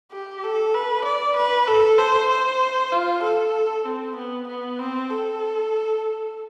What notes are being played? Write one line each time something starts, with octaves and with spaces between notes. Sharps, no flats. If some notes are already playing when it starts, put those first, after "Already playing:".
G4
A4
B4
D5
B4
A4
C5
C5
F4
A4
C4
B3
B3
C4
A4